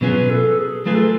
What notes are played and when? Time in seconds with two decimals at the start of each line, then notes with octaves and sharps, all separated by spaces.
0.01 B2 F#3 C#4 F4 G#4 B4
0.30 A4
0.58 G#4
0.86 F#3 A3 F4 G#4 B4
0.95 A4